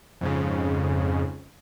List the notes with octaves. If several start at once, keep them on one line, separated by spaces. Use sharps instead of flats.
F2 G#2 C#3